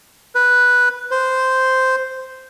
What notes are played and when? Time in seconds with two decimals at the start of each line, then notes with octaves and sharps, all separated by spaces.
0.35 B4
1.11 C5